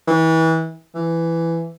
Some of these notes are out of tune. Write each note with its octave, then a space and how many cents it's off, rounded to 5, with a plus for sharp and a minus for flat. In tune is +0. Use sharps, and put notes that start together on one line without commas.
E3 -30
E3 +10